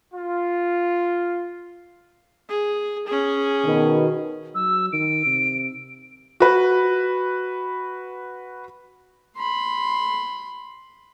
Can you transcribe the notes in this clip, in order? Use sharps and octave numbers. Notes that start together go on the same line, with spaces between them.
F4
G#4
C#4 G#4
B2 D#3
F#3 E6
D#3 D7
C3
F#4 B4
B5 C6